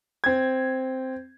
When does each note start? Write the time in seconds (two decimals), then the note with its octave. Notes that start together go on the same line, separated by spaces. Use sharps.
0.24 C4 G#6